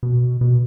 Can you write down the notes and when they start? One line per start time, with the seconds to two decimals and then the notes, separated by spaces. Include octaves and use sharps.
0.03 B2
0.41 B2